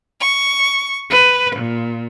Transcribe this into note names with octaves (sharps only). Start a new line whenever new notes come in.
C#6
B4
A#2